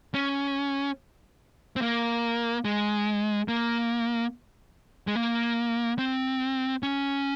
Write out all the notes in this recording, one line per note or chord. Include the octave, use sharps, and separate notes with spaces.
C#4
C4
A#3
G#3
A#3
G#3
A#3
C4
C#4